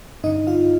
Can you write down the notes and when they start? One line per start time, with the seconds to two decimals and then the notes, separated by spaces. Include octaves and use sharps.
0.24 G2 D3 D#4 D#5
0.47 F4 F5